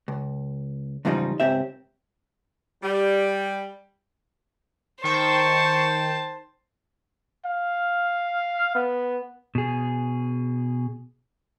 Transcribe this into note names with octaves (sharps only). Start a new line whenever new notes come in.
C#2
E2 G#2 C#3 F3 G3 D#4
C#2 G#2 C4 G4 E5
G3
D#3 C5 G5 A5 C#6
F5
B3
B2 G#4